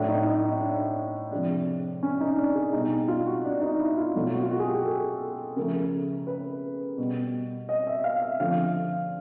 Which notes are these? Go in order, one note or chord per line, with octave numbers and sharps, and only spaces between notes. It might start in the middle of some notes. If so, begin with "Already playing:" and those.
Already playing: A2 F#3 A3 D4
D#4
D#4
D#4
D4
C3 F3 G#3 D4
C#4
D#4
D4
G#4
B2 G3 D#4
F4
F#4
D4
D#4
E4
F4
B2 F#3 A3 F4
F#4
F4
F#4
G#4
G4
A4
C#3 F3 A3 A#4
B4
B2 G3
D#5
E5
F5
E5
D3 F3 A3 F5